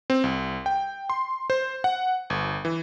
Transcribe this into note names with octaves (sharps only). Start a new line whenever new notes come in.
C4
C2
G5
C6
C5
F#5
G1
E3